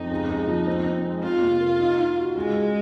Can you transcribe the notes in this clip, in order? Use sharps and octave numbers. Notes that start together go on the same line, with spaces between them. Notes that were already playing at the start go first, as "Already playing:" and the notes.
Already playing: F2 D#4
C#2
C#2
F3
C4
C4
G#3
F2 F4
C3
A#3
D#4
D#4
F#4
C#2 G#3
C#2